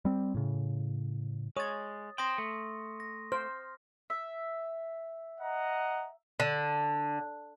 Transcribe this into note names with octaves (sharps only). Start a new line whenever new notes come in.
G3 C4
A2 C#3
G#3 C#5 D#6 A6
C5 G5 C6 D#6 A#6
A3
A#6
C5 F6
E5
D#5 F#5 A#5
D3